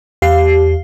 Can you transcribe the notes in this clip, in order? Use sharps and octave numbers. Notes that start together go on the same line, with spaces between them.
E2 G4 F5 C7